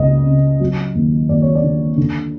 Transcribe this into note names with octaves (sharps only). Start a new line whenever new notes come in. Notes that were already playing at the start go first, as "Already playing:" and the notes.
Already playing: C#2 D#5
C#3
F#3
D#2
D#2 D5
C#5
D5
D3
D3